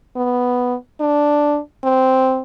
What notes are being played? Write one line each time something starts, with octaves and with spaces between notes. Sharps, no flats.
B3
D4
C4